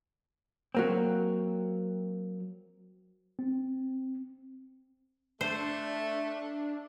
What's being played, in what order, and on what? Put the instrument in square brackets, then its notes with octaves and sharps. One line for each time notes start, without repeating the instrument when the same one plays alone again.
[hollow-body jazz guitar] F#3 A#3 C4
[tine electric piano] C4
[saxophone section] A3 [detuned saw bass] D4 [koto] C5